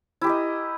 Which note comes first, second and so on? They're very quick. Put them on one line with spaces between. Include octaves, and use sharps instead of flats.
E4 G4 A#4 D#5